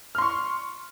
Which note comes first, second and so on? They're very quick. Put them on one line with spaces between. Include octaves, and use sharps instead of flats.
F6 C6 C#6